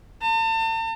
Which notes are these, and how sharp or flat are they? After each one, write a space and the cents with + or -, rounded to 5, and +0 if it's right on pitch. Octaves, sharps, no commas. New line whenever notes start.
A5 +40